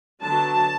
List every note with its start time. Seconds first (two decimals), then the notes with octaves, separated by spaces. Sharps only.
0.21 D3 F#3 B3 A5